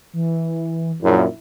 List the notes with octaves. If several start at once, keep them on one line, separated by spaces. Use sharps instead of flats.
E3
A#1 F#2 E4